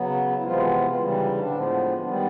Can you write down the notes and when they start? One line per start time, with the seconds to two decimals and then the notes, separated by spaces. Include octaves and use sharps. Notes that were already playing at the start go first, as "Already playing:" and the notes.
Already playing: C#3 F#3 B3
0.38 E4
0.43 C3 E3 F3 G#3 B3 F4
0.89 F4
0.97 C#3 E3 G3 E4
1.10 D#3 D#4
1.24 D#3 D#4
1.37 D3 D4
1.51 A2 F3 G#3 B3
2.04 D3 D#3 G3 B3 D4